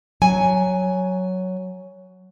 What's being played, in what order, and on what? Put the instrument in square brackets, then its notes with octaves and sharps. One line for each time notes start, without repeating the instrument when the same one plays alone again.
[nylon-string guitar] F#3 G#5